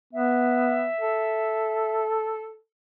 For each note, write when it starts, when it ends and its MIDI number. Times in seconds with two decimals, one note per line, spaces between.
0.13 0.88 59
0.13 2.04 76
1.01 2.59 69